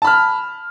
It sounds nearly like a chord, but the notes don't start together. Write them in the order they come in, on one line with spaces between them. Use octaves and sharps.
A5 B5 F6